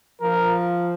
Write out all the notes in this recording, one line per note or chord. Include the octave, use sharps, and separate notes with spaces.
F3 A#4